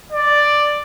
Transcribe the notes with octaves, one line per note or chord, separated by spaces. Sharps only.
D5